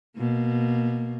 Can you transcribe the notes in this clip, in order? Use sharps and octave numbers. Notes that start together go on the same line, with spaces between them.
B2 A#3